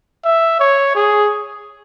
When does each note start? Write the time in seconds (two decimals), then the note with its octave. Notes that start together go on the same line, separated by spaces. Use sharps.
0.24 E5
0.60 C#5
0.95 G#4